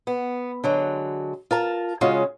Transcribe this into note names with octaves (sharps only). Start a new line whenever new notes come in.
B3
D3 F#3 G#3
F4 A#4 A5
C#3 G#3 C#4 F4 F#4